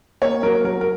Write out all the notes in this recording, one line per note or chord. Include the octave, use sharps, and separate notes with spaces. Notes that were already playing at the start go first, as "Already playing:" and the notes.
A#3 C#5
F#3 A#4
F#3 A#4
A#4